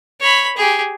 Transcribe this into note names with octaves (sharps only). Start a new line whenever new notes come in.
C#5 B5
G4 G#4